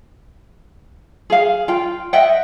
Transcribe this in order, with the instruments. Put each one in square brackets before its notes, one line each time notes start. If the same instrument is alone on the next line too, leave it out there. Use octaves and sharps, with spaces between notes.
[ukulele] G#4 F5
F4 G5
D#5 E5 F#5 G5